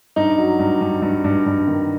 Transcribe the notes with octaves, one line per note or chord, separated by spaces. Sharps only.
G2 D#4
F#3
G2
G2
G2
G2
G2
D#3